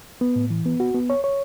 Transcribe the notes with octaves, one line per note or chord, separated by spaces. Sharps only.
B3
A2
E3
B3
F#4
B3
C#5
C#5